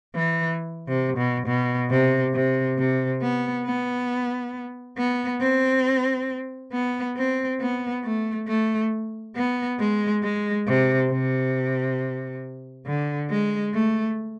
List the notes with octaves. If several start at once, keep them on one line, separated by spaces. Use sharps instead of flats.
E3
C3
B2
B2
C3
C3
C3
B3
B3
B3
C4
B3
C4
B3
A3
A3
B3
G#3
G#3
C3
C3
D3
G#3
A3